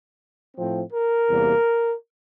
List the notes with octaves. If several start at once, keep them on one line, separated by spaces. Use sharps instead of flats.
A2 F3 C4
A#4
E2 C3 G3 A#3